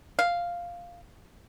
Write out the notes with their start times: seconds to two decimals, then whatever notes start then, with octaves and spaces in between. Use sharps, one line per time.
0.19 F5